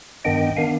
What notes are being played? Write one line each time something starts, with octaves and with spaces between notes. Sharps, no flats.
G2 D#3 B3 D4 D#5 G5
D#3 B3 D4 F5 G#5